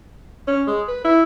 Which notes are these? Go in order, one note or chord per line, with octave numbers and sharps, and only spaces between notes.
C#4
G#3
B4
E4